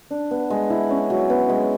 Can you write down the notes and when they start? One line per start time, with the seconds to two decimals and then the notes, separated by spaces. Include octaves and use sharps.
0.11 D4
0.31 B3
0.50 G#3
0.70 E4
0.90 C#4
1.10 F#3
1.30 B3
1.49 G#3